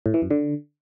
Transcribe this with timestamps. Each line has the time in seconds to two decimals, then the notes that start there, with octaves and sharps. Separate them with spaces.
0.06 A2
0.14 E3
0.22 F#2
0.31 D3